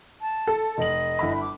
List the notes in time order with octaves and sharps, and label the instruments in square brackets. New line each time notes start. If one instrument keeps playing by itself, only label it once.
[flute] A5
[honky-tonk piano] A4
[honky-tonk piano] F1 F#7 [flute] D#5
[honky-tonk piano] G1 E4 B5
[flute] D6